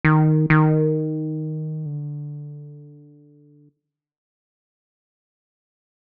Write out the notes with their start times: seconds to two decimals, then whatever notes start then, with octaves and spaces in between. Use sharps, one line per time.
0.05 D#3
0.50 D#3
1.86 D3